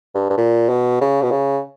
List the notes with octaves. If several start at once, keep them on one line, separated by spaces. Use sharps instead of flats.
G2
G2
A#2
B2
C#3
B2
C#3